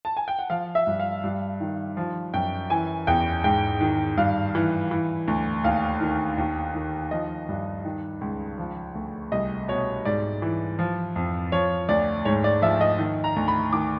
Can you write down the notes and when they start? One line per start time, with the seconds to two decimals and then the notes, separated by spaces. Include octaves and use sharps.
0.05 A5
0.17 G#5
0.28 G5
0.39 F#5
0.50 F3 F5
0.75 E5
0.87 G2
0.99 F5
1.24 G2
1.60 D#3
1.97 F3
2.34 F#2 G5
2.70 E3 G#5
3.07 E2 G5
3.44 G#2 G5
3.81 D#3
4.17 G2 F5
4.55 E3
4.91 E3
5.28 D2
5.64 D#2 F5
6.01 D#3
6.38 D#2
6.74 D#3
7.11 F3 D#5
7.49 G2
7.85 D#3
8.21 C#2
8.58 F3
8.95 D2
9.32 C2 D#5
9.68 B2 C#5
10.05 G#2 D5
10.42 E3
10.79 F3
11.16 F2
11.52 F3 C#5
11.89 D2 D5
12.25 G#2 C#5
12.44 D5
12.62 F3 E5
12.81 D#5
12.99 D#3
13.24 A#5
13.36 D2
13.48 B5
13.73 D#3 D6